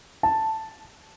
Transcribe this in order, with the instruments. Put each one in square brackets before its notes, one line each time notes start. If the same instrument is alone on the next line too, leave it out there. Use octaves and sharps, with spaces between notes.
[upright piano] A5